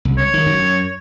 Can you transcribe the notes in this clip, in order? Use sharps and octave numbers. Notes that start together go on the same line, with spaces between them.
C2
C#5
D#3
F#2